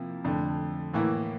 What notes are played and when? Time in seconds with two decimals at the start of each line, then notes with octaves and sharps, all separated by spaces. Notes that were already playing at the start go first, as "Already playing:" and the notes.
Already playing: C3 F3 A#3 E4
0.24 F2 D3 A3
0.94 A2 E3 A#3 E4